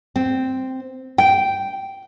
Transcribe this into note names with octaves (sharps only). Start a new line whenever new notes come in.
C4
G5